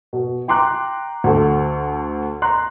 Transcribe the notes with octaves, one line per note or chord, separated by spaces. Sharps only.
B2
G5 A#5 C6 D6 F#6
D2 A4
A#5 C6 F#6